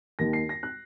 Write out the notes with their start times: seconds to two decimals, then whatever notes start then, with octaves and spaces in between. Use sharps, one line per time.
0.19 D#2 D#3 A#3 A#6
0.33 C7
0.49 A#6
0.63 F#6